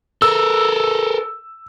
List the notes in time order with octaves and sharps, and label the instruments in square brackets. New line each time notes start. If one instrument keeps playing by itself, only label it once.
[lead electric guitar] A4 A#4 [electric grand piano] E6